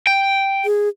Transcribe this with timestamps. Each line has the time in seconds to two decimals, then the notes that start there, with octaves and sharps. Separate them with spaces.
0.07 G5
0.65 G#4